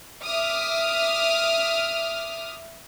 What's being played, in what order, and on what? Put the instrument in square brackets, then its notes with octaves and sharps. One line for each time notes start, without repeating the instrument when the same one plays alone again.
[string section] E5 D6 D#6 F6